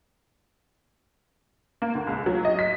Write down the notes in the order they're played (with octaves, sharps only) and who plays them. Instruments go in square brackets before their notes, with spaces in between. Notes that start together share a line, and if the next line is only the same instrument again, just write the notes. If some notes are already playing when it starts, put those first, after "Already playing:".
[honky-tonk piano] A#3
D2
C#2
F#3
D#5
B6